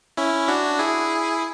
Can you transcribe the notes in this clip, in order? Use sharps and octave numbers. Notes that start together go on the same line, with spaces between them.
C#4 E4
D4 F#4
E4 G#4